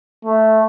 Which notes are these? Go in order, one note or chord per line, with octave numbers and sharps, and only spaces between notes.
A3